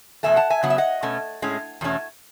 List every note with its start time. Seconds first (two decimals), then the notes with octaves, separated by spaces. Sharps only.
0.23 E2 B2 A3 E5 G#5
0.36 F#5 A5
0.50 E5 G#5
0.63 C#3 F#3 B3 F#5
0.70 E5
0.78 D#5 F#5
1.03 B2 A3 C#4
1.42 A2 G#3 C#4
1.81 E2 B2 A3 C#4